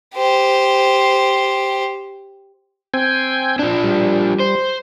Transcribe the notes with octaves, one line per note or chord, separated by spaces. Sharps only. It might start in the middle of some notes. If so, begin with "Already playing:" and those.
G4 C5
C4 G5 G#5
F3 D4
G3
C5